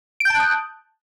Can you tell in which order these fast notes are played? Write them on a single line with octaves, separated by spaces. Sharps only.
D7 G6 A5 F#6 D#6